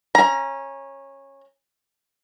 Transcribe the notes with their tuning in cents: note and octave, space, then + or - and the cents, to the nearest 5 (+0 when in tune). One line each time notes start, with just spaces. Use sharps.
C#4 -15 A#5 +20